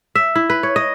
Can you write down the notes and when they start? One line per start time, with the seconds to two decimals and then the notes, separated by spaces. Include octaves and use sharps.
0.15 E5
0.35 E4
0.50 B4
0.63 C#5
0.76 D#5